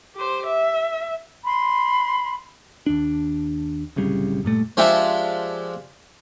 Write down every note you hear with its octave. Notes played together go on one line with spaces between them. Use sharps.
G4 C5
E5
B5 C6
D#2 D4
D1 C2 C#3 G3
G2 A#2 A3
F3 G#3 D4 G4 C5 E5